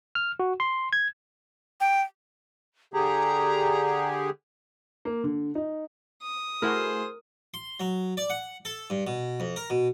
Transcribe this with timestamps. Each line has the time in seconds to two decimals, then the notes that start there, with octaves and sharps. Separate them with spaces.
0.15 F6
0.40 F#4
0.60 C6
0.93 G#6
1.81 G5
2.94 D3 G4 G#4 A#5
5.05 A#3
5.24 D3
5.55 D#4
6.23 D#6
6.62 A3 E4 F#4 G#4 A#4 C5
7.54 C6
7.80 F#3
8.17 D5
8.30 F#5
8.65 A4
8.90 G2
9.07 B2
9.40 F2
9.56 A#4
9.70 B2